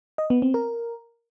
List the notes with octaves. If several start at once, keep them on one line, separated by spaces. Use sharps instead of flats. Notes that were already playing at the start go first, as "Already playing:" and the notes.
D#5
B3
C4
A#4